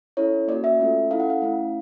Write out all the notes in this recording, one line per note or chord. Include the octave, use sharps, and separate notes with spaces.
C#4 E4 A4 C#5
A#3 C#4 F#4 D5
E5
A3 C#4 F4 A4
C#4 E4 A4 F5
F#5
F5
A3 C#4 E4